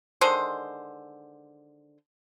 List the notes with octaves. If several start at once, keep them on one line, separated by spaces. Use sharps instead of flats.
D3 D#3 G#3 C5